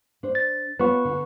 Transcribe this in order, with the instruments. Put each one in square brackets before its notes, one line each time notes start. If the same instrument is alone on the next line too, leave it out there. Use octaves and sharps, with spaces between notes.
[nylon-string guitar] D4 C5
[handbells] A6
[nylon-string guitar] B3 F4 C#5 [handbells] B4 C#6
[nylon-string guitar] D3